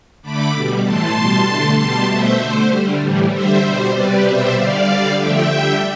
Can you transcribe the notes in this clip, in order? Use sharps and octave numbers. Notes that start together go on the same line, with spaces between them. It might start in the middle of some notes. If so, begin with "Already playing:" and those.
D3 A3 B5 D6
B2 G3
A2 E3 A3 A5 C6
B2 G3
D3 A3
B2 G3 A5 C6
B2 A3 C5 E5
D3 A3 C5
D3 G3
A2 E3 G3
D3 G3 C5 E5
B2 G3 C5
C3 G3 B4 D5
B2 G3 C5 E5
D3 G3 D5 F5
D3 G3
D3 F3 A3 E5 G5
D3 G3